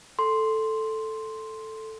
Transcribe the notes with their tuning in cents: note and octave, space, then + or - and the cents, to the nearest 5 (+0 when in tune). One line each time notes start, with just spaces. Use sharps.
A4 +0 C6 +0